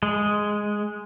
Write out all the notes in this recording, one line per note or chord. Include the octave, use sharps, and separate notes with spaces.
G#3